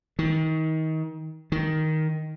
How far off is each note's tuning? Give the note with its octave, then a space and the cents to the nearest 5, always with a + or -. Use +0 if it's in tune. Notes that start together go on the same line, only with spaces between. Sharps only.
D#3 +30
D#3 +5